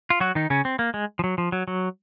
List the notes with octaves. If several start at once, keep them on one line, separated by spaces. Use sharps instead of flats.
F4
F#3 F#4
D#3 D#4
C#3 C#4
C4
A#3
G#3
F3
F#3
F3
F#3
F#3